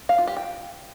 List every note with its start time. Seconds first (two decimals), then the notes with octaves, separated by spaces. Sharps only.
0.09 F5
0.18 F4
0.27 G4
0.37 G5